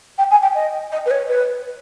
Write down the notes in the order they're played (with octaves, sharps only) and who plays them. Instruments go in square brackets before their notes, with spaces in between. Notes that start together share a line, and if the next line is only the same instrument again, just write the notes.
[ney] G5
G#5
G5
D#5
D#5
B4
C#5
B4